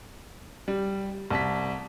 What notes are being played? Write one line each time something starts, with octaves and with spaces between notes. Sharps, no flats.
G3
C2 A5 B6